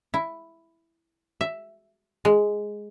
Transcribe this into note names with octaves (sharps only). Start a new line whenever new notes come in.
E4
E5
G#3